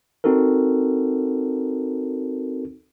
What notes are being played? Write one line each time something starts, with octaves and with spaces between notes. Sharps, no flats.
C4 D#4 F#4 A4 A#4